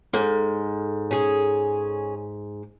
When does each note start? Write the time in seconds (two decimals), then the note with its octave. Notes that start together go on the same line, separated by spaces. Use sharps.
0.13 G#2 A4
1.11 C#4 G#4